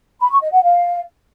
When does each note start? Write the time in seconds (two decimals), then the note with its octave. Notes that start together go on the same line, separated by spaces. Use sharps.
0.21 B5
0.31 C#6
0.42 D#5
0.52 F#5
0.63 F5